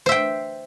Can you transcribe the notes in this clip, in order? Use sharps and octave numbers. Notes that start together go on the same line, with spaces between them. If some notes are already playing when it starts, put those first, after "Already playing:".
C5 E5 G5